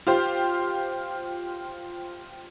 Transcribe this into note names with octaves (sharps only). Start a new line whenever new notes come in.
F4 G4 C5